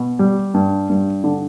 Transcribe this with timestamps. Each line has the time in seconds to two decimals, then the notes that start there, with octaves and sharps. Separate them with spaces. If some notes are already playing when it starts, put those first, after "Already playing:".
Already playing: B2
0.19 G3
0.54 G2
0.89 G2
1.24 D3